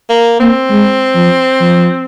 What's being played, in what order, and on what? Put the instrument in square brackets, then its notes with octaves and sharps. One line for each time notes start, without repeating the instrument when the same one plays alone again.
[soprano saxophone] A#3
[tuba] A#3 [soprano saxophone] C4
[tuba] G#3
F3
F3